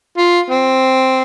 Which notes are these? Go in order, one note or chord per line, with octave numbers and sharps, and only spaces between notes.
F4
C4